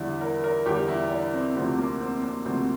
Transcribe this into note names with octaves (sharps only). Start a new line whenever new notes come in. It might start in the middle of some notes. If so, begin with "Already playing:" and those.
Already playing: E2 D3 G3 E4
A#4
A#4
E2 D3 G3 G4
E4
D4
C4
D2 C3 F3 C4
A#3
C4
A#3
D2 C3 F3 C4